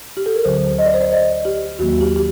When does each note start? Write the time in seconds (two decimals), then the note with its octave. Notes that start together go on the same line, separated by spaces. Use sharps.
0.17 G4
0.26 A4
0.36 A#4
0.45 D2 D3 F#3 C5
0.79 D#5
0.86 D5
0.94 C5
1.01 D5
1.13 D#5
1.45 G4
1.79 D#2 D#3 F#3 A#3 F#4
2.01 G4
2.16 G4